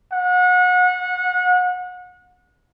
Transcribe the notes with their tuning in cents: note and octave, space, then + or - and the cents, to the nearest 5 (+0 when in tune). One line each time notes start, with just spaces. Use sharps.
F#5 -30